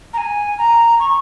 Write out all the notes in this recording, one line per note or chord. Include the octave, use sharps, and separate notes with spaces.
A#5
G#5
A#5
C#6